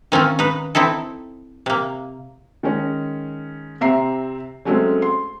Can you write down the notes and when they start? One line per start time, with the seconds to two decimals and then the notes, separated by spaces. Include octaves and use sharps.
0.12 D#3 C4 C#4 F4
0.39 D#4 B4
0.75 C4 D#4 E4 A4
1.66 C3 A#3
2.63 D#3 G#3 C#4
3.81 C3 C4 E5 A#5 C7
4.65 F#3 G#3 A3 C4 C#4
5.02 C6